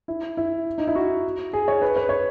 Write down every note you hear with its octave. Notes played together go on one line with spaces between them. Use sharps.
E4
E4
D#4
E4
F#4
G#4
C#5
B4
B4
C#5